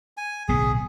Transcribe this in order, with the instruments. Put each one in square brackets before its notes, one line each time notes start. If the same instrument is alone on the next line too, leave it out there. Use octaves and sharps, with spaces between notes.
[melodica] G#5
[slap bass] D1 B1 B3 [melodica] G#4